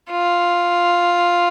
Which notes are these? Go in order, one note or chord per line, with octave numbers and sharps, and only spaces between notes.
F4